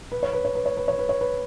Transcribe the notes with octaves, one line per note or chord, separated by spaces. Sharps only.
B4
C#5
B4
C#5
B4
C#5
B4
C#5
B4
C#5
B4